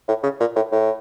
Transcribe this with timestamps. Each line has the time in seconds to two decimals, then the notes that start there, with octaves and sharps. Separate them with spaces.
0.08 A2
0.23 C#3
0.40 A#2
0.56 A2
0.72 A2